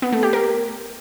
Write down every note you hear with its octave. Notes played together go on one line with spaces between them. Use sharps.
B3
A3
G4
A#4